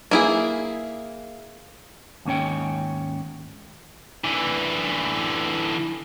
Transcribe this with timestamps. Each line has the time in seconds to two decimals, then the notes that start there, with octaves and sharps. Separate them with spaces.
0.11 A#3 E4 G#4
2.25 D#2 G#2 C#4 C#5 G5
4.25 D3 E3